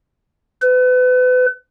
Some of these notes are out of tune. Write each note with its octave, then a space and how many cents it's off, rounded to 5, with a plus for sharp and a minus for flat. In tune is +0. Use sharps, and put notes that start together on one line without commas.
B4 +35